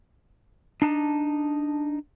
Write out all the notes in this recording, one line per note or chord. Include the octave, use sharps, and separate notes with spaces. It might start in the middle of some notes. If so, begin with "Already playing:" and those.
D4 D#4 A5